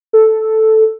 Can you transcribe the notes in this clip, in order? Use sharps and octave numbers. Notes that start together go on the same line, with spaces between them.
A4